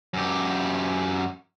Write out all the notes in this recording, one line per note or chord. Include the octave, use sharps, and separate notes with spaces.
F#2 G4